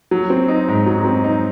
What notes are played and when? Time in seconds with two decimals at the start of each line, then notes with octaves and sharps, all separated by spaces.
0.11 F#3
0.30 C4
0.48 D#4
0.68 G#2
0.86 F#3
1.05 C4
1.24 D#4